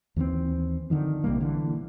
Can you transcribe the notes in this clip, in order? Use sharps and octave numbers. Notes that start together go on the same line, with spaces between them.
D#2 E3 F#3 C4
D3 D#3 F3
A#1 C3 G3 A#3
D3 E3